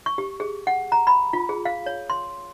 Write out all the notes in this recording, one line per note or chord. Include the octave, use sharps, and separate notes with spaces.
C#6
G4
G#4
F#5
A#5
B5
F4
G#4
F5
C#5
C6